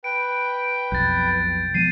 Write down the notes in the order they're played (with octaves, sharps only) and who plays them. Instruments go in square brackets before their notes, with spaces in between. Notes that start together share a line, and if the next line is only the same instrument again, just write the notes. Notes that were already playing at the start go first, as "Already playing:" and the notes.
[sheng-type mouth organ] B4 G5 [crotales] D7
[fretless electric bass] B1 F2 [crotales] G6 A6
[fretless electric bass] F3 G#3 B3 [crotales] C7 D#7